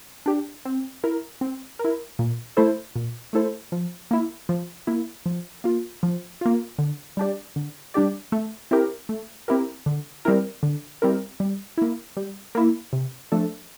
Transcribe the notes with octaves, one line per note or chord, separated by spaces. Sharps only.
D4 G4
C4
E4 A#4
C4
A#4
E4
A#2
A3 E4 A4 C5
A#2
A3 E4 A4 C5
F3
A#3 E4
F3
A#3 E4
F3
A#3 F4
F3
A#3 F4
D3
G3 D4 G4 D5
D3
G3 D4 G4 D5
A3
C4 E4 G4 A#4
A3
C4 E4 G4 A#4
D3
G3 C4 E4 A#4
D3
G3 C4 E4 A#4
G3
A#3 E4
G3
A#3 E4
C3
F3 A3 D4 A4